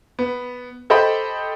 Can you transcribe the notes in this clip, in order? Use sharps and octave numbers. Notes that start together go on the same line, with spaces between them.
B3
G4 A4 C5 D#5 G5 B5